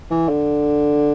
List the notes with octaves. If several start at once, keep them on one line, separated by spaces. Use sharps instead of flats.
E3
D3